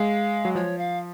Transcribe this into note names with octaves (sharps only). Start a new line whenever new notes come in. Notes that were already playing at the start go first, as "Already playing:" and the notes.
Already playing: G#3 F5
F#3
F3 C#5
F5